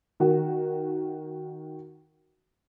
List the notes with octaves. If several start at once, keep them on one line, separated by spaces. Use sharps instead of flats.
D#3 F#4